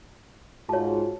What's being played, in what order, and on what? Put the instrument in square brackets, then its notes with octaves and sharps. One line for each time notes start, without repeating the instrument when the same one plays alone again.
[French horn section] G#2 F4 F#4 [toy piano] C#5 A5